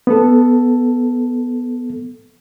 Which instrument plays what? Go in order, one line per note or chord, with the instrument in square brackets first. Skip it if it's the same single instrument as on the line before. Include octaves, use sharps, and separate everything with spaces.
[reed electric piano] B3 A4